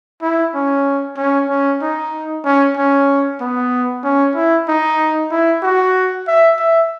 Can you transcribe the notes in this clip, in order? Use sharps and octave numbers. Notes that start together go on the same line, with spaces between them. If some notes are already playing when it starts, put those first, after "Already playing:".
E4
C#4
C#4
C#4
D#4
C#4
C#4
B3
C#4
E4
D#4
E4
F#4
E5
E5